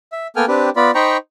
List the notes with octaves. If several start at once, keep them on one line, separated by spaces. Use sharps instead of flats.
E5
A#3 B3 A4 G5 G#5 F6
C4 D4 G4 B4
B3 F4 D5 B5
D#4 C5 G5 A#5 B5 C#6